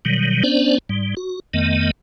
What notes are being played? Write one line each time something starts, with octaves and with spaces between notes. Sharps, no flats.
B2 D#3 F#3 G3
B3 C#4 D4 C5 D5
G#2 G3
F#4
F2 D#3 A3 B3 D#5